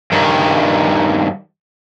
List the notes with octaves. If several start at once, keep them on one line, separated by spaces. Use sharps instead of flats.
G2 D#3